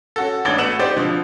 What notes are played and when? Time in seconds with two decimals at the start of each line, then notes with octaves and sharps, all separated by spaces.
0.16 C#4 F#4 A4
0.45 A1 D4 D5 G#6 G7
0.58 A3 B3 F#4 E6 E7 F#7
0.79 C4 D#4 G4 C5 D5
0.96 B2 D3 F3